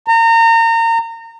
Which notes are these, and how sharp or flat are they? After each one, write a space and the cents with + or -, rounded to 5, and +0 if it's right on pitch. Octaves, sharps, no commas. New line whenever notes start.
A#5 -30